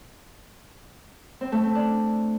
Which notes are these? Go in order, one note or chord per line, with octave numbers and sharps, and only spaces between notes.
C4
A3
C4
D4